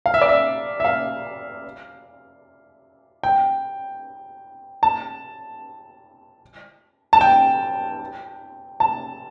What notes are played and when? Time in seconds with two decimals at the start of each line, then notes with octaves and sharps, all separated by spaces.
0.06 F5
0.14 E5
0.21 D5
0.29 E5
0.80 E5
0.85 F5
3.23 G5
4.83 A5
7.13 A5
7.21 G5
8.80 A5